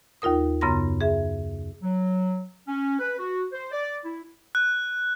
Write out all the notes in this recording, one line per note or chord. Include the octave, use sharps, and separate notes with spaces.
D#2 D#4 F4 A#4 D#6
F#2 C#3 B3 A#5 C6 A#6
G#4 E5
F#3
C#4
B4
F#4
C5
D5
E4
F#6